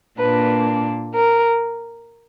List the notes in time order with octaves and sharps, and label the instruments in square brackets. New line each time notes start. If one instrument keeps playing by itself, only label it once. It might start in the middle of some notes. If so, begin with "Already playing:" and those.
[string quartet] A#2 A#3 D4 B4
A#4